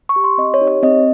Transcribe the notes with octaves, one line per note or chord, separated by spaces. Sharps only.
C#6
G4
C6
C4 D#5
C#5
D#4 G4
C#5
C4 D#5